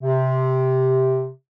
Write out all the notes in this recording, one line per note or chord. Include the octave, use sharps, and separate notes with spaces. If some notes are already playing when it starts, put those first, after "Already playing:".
C3